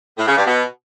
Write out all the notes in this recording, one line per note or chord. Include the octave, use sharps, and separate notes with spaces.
A2
C#3
G2
B2